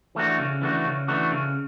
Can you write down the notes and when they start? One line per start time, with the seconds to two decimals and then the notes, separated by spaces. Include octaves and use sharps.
0.15 E3 A3 D4 F#4
0.39 C#3
0.61 E3 A3 D4 F#4
0.85 C#3
1.08 E3 A3 D4 F#4
1.31 C#3